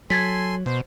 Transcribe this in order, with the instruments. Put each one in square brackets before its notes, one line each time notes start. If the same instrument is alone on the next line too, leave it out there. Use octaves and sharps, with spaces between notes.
[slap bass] F#3 [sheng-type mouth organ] A4 G#5 C6 [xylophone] G#6 A6 B6
[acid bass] B2 [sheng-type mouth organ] C5